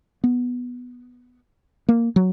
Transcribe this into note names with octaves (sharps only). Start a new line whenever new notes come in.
B3
A#3
F#3